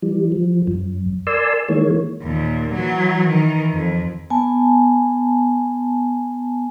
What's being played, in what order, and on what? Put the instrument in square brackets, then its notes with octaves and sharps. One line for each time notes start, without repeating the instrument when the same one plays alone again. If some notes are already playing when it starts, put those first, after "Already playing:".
[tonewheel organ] E3 G3
F3
F#2
A#4 D5 G#5 A5 C6 E6
D#3 E3 G#3 A#3 C#5
[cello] D#2 A#2
E3 F#3
D#3 E3
F2
[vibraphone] B3 G#5 A5